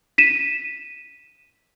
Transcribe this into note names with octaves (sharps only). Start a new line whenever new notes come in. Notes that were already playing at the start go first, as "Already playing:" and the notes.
B6 D#7 E7